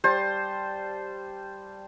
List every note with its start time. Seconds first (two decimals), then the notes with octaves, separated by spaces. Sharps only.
0.04 G3 C5 A5